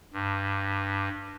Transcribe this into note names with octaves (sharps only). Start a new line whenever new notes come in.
G2